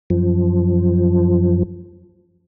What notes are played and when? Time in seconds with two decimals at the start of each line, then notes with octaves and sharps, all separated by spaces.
0.10 F#2 F3